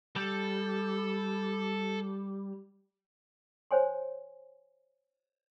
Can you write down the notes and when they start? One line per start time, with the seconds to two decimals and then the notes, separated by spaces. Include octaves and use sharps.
0.16 G3 A4
3.71 C5 C#5 G#5 C6